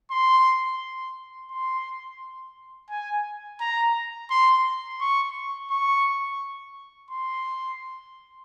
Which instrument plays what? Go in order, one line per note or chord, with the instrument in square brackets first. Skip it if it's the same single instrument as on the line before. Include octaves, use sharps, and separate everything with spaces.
[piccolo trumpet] C6
C6
G#5
A#5
C6
C#6
C#6
C6